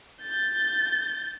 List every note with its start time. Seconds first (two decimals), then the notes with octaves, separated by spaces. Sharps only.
0.22 G6 A6